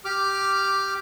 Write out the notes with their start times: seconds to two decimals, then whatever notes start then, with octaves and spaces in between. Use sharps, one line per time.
0.05 G4 D6 F6